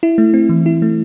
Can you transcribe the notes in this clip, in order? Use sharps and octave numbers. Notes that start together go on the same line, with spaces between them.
E4
A3
C4
E3
E4
A3